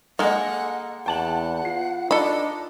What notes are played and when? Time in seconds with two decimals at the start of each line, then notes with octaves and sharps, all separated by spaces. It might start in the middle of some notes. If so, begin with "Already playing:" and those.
0.19 G#3 A#3 A4 D#5 F#5
1.06 E2 F#5 G5 A5 F#7
1.65 F4 C7
2.11 D4 D#4 A4 B5